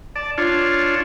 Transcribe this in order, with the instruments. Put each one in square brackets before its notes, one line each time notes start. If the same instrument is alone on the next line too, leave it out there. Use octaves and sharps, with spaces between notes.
[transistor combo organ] D5 A5
D4 F4 C#5 A5